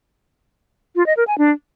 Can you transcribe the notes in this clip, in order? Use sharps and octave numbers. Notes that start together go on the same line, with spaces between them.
F4
D#5
A#4
G#5
D4